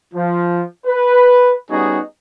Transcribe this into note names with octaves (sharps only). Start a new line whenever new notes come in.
F3
B4
G3 B3 C#4 D#4 F#4 G#4